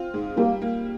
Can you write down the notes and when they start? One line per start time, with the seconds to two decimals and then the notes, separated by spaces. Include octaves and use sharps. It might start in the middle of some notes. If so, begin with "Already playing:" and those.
Already playing: C4 F4
0.14 G#2
0.37 G3 A#3
0.62 A#3